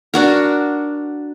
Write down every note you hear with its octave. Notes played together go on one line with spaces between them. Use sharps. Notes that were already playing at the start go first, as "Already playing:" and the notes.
D4 F#4 A#4